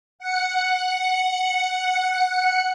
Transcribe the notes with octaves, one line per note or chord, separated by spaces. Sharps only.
F#5 C#7